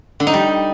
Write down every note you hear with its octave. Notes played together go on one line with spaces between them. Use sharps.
D3
D#4
G3